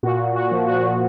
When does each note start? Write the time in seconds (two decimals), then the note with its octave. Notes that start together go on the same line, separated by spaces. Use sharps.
0.03 A#2 F#4
0.19 A#2
0.35 A#2 F#4
0.51 F3
0.68 A#2 F#4
0.84 F3